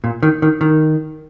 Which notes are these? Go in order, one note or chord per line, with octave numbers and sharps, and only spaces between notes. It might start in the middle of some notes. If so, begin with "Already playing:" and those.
A#2
D#3
D#3
D#3